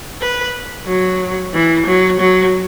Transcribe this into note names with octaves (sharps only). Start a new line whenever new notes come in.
B4
F#3
E3
F#3
F#3